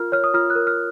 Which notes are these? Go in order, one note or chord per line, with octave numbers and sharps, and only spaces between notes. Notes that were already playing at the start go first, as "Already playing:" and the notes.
Already playing: F4 A#4 F6
C#5 F6
D#6
F4 F6
F#6
A#4
F6